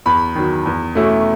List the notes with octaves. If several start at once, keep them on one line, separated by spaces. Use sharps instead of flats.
E2 B5
D#3 F#3
E2
B2 A3 C#4 E4